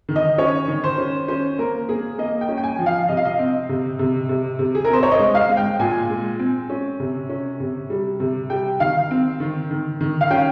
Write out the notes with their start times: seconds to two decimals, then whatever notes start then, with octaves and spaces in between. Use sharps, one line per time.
0.09 D#3
0.16 D#5
0.38 C#4 C#5
0.68 D#3
0.84 C5
0.98 C#4
1.28 C#4 C5
1.58 A#3 A#4
1.89 A#3 G#4
2.18 A#3 D#5
2.41 G5
2.49 C#4
2.58 G5
2.64 G#5
2.79 F3
2.86 F5
3.09 C3 D#5
3.17 F5
3.25 D#5
3.39 C4
3.69 C3
3.99 C3
4.29 C3
4.59 C3
4.75 G#4
4.85 A#4
4.90 C4 C5
5.03 C#5
5.12 D#5
5.20 G#3
5.35 F5
5.49 G#3
5.57 G5
5.79 A#2 G#5
6.10 G#3
6.39 C4
6.70 C#4
7.00 C3
7.29 C#4
7.60 C3
7.90 G3
8.20 C3
8.50 G3 G5
8.80 D#3 F5
9.11 C4
9.40 D#3
9.71 D#3
10.01 D#3
10.21 F5
10.30 C#4 G5